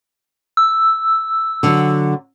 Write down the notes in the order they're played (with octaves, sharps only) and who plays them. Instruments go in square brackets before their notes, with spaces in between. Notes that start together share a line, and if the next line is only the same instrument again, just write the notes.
[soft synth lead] E6
[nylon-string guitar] D3 F#3